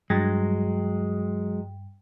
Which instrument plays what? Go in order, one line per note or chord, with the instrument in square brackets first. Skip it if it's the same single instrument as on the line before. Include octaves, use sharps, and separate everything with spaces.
[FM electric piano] G2 [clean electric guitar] F#3 G#3